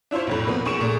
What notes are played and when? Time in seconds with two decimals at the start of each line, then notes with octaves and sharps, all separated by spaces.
0.11 D4 E4 F4 C5 C#5
0.27 B1 F2 A2
0.47 B2 F3 A#3 C4 B4
0.65 B1 G#4 C#6 D7 E7
0.81 A#2 A3 G#4